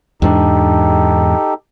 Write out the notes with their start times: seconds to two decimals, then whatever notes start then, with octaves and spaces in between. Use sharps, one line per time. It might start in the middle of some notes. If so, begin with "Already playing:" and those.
0.22 E2 G#2 D4 D#4 G4 A4